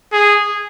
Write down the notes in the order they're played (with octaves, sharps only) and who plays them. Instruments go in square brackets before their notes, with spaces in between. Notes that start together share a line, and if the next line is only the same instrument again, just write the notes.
[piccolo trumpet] G#4